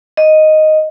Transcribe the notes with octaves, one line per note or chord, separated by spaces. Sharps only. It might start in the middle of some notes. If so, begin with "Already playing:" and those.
D#5